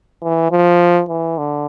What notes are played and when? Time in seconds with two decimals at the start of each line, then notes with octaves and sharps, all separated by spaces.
0.23 E3
0.51 F3
1.09 E3
1.38 D3